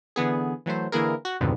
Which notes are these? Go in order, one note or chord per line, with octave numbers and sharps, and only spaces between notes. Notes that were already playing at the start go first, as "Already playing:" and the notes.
D3 E3 B3 G#4
E3 F#3 A3 C5
D3 E3 A#3 E4 G#4 A#4
F#4
B1 F2 G#2 B2 D3 D#3